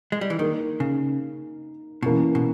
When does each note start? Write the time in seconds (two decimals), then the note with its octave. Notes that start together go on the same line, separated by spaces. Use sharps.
0.12 G#3
0.21 G3
0.30 E3
0.38 D#3 A#3 D#4 A#4
0.80 C#3
2.02 B2 E3 A#3 C#4 E4
2.35 B2